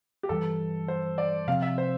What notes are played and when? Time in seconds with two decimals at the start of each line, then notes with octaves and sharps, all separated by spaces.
0.23 G4
0.29 G2 E3 G3 A4
0.88 C5
1.18 D5
1.48 C3 F3 C4 F5
1.62 E5
1.78 C5